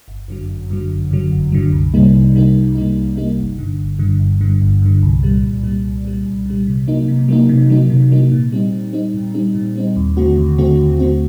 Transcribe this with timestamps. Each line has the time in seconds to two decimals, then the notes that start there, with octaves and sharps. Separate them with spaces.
0.08 G1
0.28 F#2 D3 F#3
0.49 G1
0.70 F#2 D3 F#3
0.90 G1
1.11 F#2 D3 F#3
1.32 G1
1.52 F#2 D3 F#3
1.73 C2
1.94 C3 G3 A#3 D#4
2.14 C2
2.35 C3 G3 A#3 D#4
2.55 C2
2.75 C3 G3 A#3 D#4
2.96 C2
3.17 C3 G3 A#3 D#4
3.37 G1
3.58 G2 D3
3.79 G1
3.99 G2 D3
4.20 G1
4.41 G2 D3
4.61 G1
4.82 G2 D3
5.02 C2
5.23 A#2 G3
5.43 C2
5.64 A#2 G3
5.85 C2
6.05 A#2 G3
6.26 C2
6.46 A#2 G3
6.67 C3
6.88 F#3 A#3 D#4
7.08 C3
7.28 F#3 A#3 D#4
7.49 C3
7.70 F#3 A#3 D#4
7.90 C3
8.11 F#3 A#3 D#4
8.31 A#2
8.52 G3 C4 D#4
8.73 A#2
8.93 G3 C4 D#4
9.14 A#2
9.34 G3 C4 D#4
9.55 A#2
9.76 G3 C4 D#4
9.96 D#2
10.17 D3 A3 C4 F#4
10.37 D#2
10.58 D3 A3 C4 F#4
10.79 D#2
10.99 D3 A3 C4 F#4